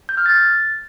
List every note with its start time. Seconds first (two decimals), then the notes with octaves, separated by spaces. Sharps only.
0.09 G6
0.17 F6
0.26 A6